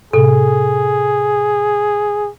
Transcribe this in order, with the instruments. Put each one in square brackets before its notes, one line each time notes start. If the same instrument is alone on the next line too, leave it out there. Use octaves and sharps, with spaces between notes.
[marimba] A2 C3 [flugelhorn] G#4 [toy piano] A4